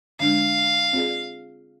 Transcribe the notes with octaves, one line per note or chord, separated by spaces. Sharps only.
D3 G#3 D4 F5
C4 F4 G#4 D5